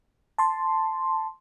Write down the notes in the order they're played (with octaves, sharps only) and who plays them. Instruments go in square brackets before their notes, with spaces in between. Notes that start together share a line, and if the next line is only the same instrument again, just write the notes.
[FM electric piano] A5 C6